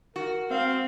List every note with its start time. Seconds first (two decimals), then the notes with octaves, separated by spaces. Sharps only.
0.16 F#4 A#4
0.50 C4 F5